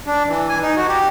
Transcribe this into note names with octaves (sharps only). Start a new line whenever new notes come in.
D4
E3
G#5
D#4
F#4
G4